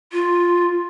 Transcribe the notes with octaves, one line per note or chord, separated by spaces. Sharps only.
F4